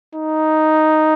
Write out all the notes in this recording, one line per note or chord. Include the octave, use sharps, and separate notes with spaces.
D#4